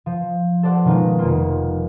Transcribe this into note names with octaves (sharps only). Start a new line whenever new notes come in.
F3
A4 C5 D5 F#5
B2 D#3 G#3 D#4 F4
F1 A#3 F4